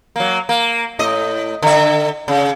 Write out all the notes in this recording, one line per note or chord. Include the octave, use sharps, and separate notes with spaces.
F#3 A#3
A#3
A2 D#5
D3 E5
C#3